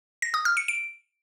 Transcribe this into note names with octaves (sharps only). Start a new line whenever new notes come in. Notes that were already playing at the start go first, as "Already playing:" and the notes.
A#6
D#6
F6
C#7
D7